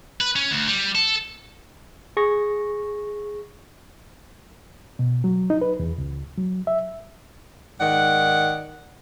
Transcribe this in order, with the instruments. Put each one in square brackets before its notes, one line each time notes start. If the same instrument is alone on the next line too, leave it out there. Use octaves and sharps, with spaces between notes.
[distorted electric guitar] B4
C#4
D2
G3
A4
[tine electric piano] G#4 C#6 A#6
[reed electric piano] B2
F#3
D#4
B4
E2
C#2
F#3
E5
[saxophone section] G#2 D#3 D5 F#5